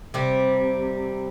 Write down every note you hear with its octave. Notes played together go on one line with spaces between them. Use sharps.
C3 G3